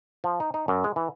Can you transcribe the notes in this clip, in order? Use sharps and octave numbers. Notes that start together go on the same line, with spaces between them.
F3
D#4
D#4
F#2
G#3
E3